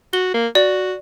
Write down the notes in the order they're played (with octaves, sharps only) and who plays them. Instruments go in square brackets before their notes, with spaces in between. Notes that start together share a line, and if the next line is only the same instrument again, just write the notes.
[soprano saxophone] F#4 [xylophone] G7
[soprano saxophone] A#3
[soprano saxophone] F#4 [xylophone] D5